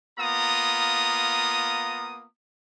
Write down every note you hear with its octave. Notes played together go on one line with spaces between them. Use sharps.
A#3 B3 F4 A#5 D#6